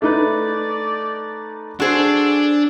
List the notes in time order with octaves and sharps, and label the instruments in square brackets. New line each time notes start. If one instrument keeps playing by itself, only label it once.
[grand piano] A3 D#4 B4 [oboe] D5
[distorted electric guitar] D4 [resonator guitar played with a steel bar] F#4 G#4 C5 [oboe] A4